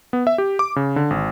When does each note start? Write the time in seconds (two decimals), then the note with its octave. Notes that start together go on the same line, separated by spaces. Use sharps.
0.13 B3
0.27 E5
0.38 G4
0.59 D6
0.76 C#3
0.96 D3
1.10 G#1